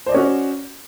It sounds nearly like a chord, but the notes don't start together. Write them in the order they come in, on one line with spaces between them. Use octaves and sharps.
C5 D5 D#5 C#4 F#4